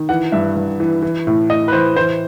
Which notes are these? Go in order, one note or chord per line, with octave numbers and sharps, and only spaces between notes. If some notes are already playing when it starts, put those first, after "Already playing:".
Already playing: D#3
E3 F#5
G2 E5
G2
E3
E3
A2
A2 D#5
B4
E3 C5
E3 C5